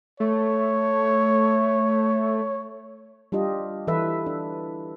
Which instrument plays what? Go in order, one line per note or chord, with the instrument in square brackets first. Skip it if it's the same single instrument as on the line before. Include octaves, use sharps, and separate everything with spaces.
[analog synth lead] A3 [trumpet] C#5
[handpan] G3 D4 F4 G4 D#5
E3 A4 B4 E5
D4